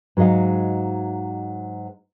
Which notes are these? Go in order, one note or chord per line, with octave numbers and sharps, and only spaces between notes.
G#2 F#3 G#3 D#5 F5